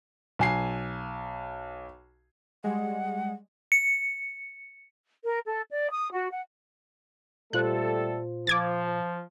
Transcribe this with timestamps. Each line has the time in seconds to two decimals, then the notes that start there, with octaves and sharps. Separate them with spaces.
0.39 B1 G#5 C7
2.64 G3 G#3 F#5
3.72 C#7
5.25 A#4
5.47 A4
5.71 D5
5.91 D#6
6.12 F#4
6.31 F#5
7.53 A#2 G3 A3 F4 A4 C5 F#6
8.47 F3 D6 G#6 A6